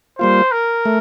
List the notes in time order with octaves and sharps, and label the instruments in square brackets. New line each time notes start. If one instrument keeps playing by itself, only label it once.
[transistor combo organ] G3 A#3 F4 [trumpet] C5
[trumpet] A#4
[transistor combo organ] A3